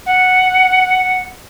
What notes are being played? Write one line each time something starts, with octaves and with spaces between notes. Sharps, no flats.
F#5